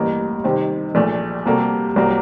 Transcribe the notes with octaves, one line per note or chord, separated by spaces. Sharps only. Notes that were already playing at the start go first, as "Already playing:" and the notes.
Already playing: A1 A2 G3 A#3
C3 D#3 G3 C4
A#1 A#2 A3
C3 G3 A#3 F#4 A4
C2 C3 F#3 A#3